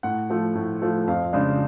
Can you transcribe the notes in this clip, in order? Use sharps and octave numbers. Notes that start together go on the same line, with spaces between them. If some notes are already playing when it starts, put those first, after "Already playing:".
A2 F#5
F3 A3
A2
F3 A3
F2 F5
C#3 G#3 D4